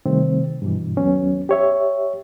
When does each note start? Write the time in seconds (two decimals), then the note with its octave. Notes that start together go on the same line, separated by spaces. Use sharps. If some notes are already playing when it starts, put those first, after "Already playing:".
0.06 C3 D#3 G3 A3 C4
0.62 G2 B2 E3
0.97 D#2 F#3 B3 C#4
1.49 G4 C#5 E5